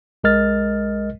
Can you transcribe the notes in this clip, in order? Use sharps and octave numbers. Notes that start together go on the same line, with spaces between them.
B1 G#3 A#4 D#5 F6 A6